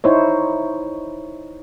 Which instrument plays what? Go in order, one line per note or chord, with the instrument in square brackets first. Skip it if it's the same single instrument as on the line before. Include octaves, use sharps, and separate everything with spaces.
[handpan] D#4 E4 C5 C#5